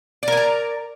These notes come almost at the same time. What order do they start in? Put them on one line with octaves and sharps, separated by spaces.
D5 A#4 G#5 A#5